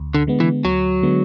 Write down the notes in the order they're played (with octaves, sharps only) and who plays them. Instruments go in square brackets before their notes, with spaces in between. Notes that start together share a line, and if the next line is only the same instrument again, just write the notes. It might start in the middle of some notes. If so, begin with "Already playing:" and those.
Already playing: [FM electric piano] D2
[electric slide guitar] D3
[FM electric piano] D3 G#3 B3
[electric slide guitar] E3
[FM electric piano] D2 [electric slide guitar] F#3
[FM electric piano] D3 G#3 B3